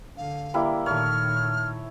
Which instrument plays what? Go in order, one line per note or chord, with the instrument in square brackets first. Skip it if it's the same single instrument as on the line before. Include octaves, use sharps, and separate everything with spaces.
[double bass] D3 [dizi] F5
[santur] G3 A#3 E4
[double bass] A#2 D#3 [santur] A3 C#5 [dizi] F6